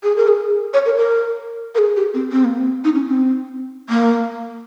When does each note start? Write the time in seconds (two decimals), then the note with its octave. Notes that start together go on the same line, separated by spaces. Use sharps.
0.04 G#4
0.16 A#4
0.28 G#4
0.74 C#5
0.86 A#4
0.97 A#4
1.75 A#4
1.78 G#4
1.96 G4
2.14 C4
2.32 C4
2.44 A#3
2.58 C4
2.84 D#4
2.95 C#4
3.07 C4
3.89 A#3